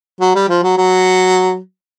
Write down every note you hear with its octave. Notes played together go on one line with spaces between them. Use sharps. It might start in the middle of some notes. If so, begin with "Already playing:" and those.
F#3
G3
F3
F#3
F#3